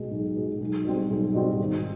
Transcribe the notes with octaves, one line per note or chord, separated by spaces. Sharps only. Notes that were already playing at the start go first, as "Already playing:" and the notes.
Already playing: B2 G#3
B1
B2 G#3
B1
B2 G3 C4
B1
B2 G3 C4
G#1